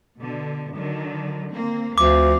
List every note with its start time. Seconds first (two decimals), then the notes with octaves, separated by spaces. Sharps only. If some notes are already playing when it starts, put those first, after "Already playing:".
0.21 B2 D3
0.76 D3 D#3 F#3
1.51 A#3 C4
1.98 D2 F3 C4 F5 D6